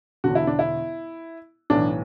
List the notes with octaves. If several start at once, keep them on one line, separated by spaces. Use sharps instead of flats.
E1 E2 D3 F#4
E4
D4
E4
B1 A2 E3 D4